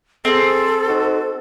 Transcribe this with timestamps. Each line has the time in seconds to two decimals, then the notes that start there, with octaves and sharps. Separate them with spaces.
0.25 C4 G#4 A4
0.88 D#4 F#4 C5